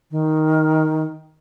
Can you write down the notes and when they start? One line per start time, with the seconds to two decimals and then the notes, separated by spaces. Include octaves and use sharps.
0.11 D#3